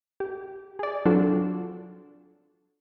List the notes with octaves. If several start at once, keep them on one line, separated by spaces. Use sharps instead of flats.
G4
G#4 D5
F#3 C4 D4 F4 A4